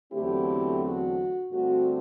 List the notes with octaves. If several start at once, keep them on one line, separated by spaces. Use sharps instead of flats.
E2 D3 F#3 A3 C4 E4 G4
F#4
G2 D3 A3 C4 F#4